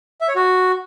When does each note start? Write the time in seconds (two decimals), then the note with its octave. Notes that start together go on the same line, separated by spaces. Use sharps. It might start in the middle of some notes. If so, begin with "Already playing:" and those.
0.21 E5
0.28 C#5
0.36 F#4